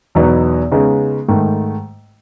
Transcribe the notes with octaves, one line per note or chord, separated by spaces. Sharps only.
E2 B2 F#3 B3 D#4
C#3 G#3 B3 D#4
G#2 D#3 A3